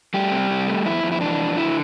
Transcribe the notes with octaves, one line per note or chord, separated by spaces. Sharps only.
G3 A3 G4
C3
C3
A3
F2 E4
F2
E4
E3 D4
F2
D3 E4